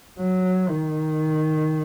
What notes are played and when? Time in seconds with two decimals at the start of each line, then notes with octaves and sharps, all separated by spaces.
0.18 F#3
0.69 D#3